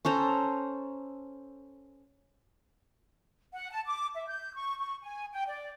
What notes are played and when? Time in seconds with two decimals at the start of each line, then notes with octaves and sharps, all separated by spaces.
0.05 C#4 A4 C5 A#5
3.54 F#5
3.71 A5
3.86 D6
4.14 E5
4.28 G6
4.54 C#6
4.79 C#6
5.03 G#5
5.33 G5
5.47 D5